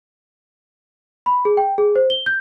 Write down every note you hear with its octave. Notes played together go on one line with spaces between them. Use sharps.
B5
G#4
G5
G#4
C5
G7
G6